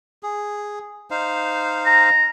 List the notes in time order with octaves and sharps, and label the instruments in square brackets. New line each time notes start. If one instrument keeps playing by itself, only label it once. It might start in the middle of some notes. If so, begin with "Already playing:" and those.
[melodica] G#4
D#4 C5 F5
[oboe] A#5